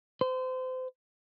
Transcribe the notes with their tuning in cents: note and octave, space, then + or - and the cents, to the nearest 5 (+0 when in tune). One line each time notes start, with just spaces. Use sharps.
C5 -30